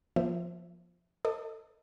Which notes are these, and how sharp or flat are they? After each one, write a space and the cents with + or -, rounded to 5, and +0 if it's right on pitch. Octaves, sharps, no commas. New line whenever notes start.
F3 +0 A#3 +40 E5 +0
A4 +25 D#5 +0 D6 +45